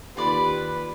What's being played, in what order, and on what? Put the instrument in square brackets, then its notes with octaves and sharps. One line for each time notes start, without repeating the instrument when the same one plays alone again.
[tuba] D#2 [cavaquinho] F4 D5 B5 [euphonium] G4 [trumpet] B4